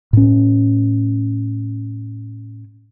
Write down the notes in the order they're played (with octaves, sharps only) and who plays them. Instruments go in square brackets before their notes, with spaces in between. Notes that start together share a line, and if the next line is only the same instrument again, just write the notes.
[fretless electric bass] A2 C#4